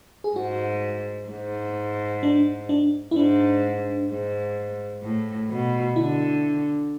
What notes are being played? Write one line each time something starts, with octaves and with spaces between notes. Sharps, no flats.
G#4
G#2 F#4
G#2
D4
D4
E4
G#2 D4
G#2
A2
B2
D3 E4